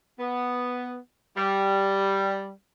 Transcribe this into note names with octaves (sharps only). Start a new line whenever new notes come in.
B3
G3